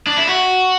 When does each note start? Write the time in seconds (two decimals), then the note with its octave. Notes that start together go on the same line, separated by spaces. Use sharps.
0.06 D4
0.17 E4
0.27 F#4